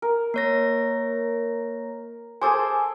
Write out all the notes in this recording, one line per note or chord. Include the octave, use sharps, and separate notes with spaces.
A#4
A#3 C#5 A#6
G#4 A4 C5 G#5 D6